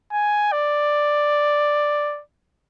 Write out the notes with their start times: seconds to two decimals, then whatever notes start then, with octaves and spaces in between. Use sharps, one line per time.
0.12 G#5
0.52 D5